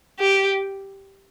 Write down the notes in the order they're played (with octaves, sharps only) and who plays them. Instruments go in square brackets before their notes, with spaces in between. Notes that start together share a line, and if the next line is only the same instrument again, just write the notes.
[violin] G4